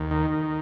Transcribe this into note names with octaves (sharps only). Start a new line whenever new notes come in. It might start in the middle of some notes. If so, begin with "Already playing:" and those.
Already playing: D#2
D#3